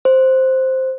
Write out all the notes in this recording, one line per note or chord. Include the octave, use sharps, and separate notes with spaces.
C5